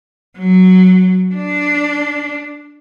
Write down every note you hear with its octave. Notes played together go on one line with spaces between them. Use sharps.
F#3
D4